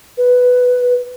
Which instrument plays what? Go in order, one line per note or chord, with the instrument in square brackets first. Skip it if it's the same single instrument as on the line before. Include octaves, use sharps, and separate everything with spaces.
[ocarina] B4